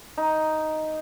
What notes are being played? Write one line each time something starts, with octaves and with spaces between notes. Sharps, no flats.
D#4